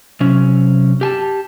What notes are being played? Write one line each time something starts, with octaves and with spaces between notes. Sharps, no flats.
C3 F#3 C#4
G4 G#5 A5